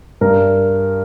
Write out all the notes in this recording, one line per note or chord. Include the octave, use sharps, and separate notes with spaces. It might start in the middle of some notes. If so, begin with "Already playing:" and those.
G2 A#4